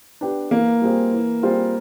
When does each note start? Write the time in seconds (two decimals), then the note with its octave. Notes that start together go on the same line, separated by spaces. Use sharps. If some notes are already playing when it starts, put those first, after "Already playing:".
0.21 B3 D4 G4
0.51 E3 A#3
0.82 G3 C4 F4 G#4
1.12 E3
1.43 G3 C4 F4 G#4